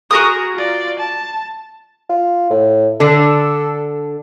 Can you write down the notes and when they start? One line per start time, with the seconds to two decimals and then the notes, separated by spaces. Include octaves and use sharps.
0.11 F#4 G#4 A#4 D#6
0.56 F4 D5
1.00 A5
2.10 F4
2.50 A2
3.00 D3 D4 A4